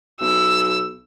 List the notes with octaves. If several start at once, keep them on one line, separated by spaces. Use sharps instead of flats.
B1 E6